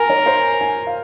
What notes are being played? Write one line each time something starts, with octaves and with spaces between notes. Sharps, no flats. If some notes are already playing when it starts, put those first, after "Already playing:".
Already playing: A#4 G#5
C#5
C5
G#5
F5